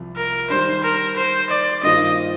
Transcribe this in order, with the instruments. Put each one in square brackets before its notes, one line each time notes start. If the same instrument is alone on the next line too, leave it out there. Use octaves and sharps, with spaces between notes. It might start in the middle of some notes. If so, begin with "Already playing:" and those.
Already playing: [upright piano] C2 C3 F3
[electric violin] A#4
[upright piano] D#3 G3 D4 [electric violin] C5
[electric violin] A#4
C5
D5
[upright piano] G2 D#3 A#3 F4 C5 [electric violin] D#5